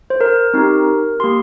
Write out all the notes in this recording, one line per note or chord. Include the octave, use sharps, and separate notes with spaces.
C5
A#4
C4 D#4 G4
A#3 G4 C6